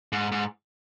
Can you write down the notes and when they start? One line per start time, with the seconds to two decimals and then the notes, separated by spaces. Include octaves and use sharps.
0.12 G#2
0.32 G#2